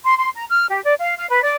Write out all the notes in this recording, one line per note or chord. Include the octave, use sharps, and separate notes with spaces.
C6
C6
A#5
F6
G4
D5
F5
F5
B4
D5